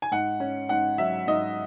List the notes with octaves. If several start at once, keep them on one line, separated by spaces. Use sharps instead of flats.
G#5
G#2 F#5
C#4
G#2 F#5
F#3 E5
G#2 D#5